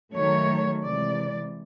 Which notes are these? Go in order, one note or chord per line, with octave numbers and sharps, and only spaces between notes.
D#3 F#3 A3 C#5
C3 E3 G#3 D5